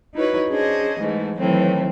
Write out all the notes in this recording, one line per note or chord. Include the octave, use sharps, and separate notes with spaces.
D#4 E4 F#4 B4 C#5
C#4 D4 G#4 C5 D#5
G#2 E3 G#3 A3
A2 D#3 E3 F#3 A3 C4